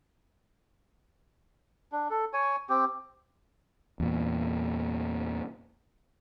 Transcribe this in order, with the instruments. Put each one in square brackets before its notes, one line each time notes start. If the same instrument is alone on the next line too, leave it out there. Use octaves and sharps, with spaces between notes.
[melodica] D4
A4
C#5 G#5
C4 G4
[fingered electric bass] E2 A#2